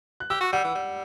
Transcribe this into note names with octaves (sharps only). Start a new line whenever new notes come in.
F#6
G4 E6
F#4
G3 F#5
E3
G3